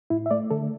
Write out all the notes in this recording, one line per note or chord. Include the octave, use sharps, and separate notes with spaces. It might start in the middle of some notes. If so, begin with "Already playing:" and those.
A2 E4
E5
A3 D5
D3 A4